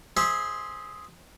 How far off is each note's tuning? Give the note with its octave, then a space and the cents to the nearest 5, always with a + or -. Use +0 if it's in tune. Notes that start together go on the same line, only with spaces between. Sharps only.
G#4 +0 C5 +0 E5 -20